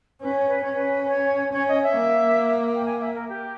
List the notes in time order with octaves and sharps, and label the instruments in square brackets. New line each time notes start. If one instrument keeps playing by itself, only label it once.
[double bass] C#4 [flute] B4
[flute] C#5
B4
[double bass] C#4 [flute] C#5
[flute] B4
B4
C#5
[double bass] C#4 [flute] C#5
[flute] D#5
E5
[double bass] A#3
[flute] G5
G#5
E5
A#4
G4